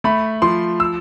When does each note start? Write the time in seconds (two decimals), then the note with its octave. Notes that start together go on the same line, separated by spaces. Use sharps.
0.04 A3 B5
0.42 F3 C6
0.80 E6